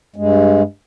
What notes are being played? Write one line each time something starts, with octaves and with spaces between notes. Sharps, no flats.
G2 G#3